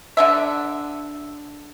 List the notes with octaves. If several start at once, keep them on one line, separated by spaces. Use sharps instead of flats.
D3 D4 E5